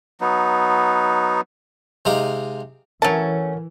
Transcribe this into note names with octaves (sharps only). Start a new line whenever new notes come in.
F#3 B3 D#4
C3 G#3 D#4 F5 D6
E3 F#3 A3 C#4 A#4 A5